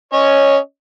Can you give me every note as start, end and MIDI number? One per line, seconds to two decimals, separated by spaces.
0.13 0.57 61
0.13 0.57 73
0.13 0.57 75